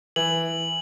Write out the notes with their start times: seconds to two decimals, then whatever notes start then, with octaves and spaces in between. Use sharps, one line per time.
0.16 E3 F#7